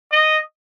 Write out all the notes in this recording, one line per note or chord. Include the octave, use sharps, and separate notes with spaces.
D#5